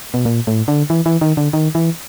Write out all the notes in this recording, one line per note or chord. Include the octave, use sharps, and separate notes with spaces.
B2
A#2
A2
D3
E3
E3
D#3
D3
D#3
E3